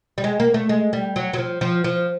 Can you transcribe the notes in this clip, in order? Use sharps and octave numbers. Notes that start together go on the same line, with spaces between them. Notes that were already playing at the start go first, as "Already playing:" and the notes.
G3
G#3
A#3
A3
G#3
G3
F#3
F#3
F3
F3
F3